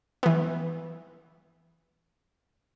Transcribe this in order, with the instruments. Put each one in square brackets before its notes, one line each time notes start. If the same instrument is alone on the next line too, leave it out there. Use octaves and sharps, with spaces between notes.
[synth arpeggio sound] E3 B3